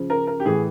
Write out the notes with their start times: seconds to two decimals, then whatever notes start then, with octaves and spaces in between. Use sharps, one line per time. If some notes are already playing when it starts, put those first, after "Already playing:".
Already playing: C#3 F3
0.10 A#4
0.27 A#4
0.40 G4
0.45 A2 E3 G#4